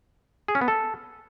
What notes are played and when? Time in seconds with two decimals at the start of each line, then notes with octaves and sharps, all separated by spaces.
0.48 G#4
0.55 C#4
0.61 B3
0.68 A4